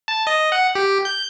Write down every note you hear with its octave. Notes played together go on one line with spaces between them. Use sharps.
A5
D#5
F#5
G4
G6